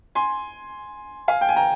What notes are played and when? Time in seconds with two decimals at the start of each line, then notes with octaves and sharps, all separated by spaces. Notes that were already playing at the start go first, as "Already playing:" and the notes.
0.15 G#5 C6
1.28 F5 G#5
1.41 G5
1.49 G#5
1.56 G5 A#5